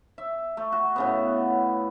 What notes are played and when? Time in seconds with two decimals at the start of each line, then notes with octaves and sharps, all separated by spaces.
0.18 E5
0.57 A3
0.72 F#4
0.96 A2 C#3 B3